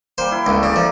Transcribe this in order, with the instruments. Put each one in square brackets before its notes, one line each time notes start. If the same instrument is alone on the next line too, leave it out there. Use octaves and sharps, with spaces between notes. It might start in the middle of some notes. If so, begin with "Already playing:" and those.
[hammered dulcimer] G3 A#3 [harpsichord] C5
[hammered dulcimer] E4
[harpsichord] C#2 [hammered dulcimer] D3 A3 A#3
[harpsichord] C#3 [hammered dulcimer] D5
[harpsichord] F3